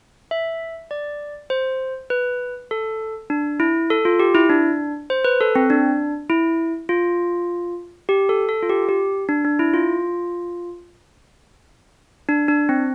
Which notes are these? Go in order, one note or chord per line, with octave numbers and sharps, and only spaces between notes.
E5
D5
C5
B4
A4
D4
E4
A4
F4
G4
E4
D4
C5
B4
A4
C4
D4
E4
F4
G4
A4
A4
F4
G4
G4
D4
D4
E4
F4
D4
D4
C4